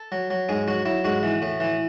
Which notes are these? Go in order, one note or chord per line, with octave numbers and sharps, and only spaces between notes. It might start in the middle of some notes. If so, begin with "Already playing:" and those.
Already playing: A4
F#3
F#3
G#2 G#4
F#3 F#4
F#3 E4
G#2 F#4
E3
A2
E3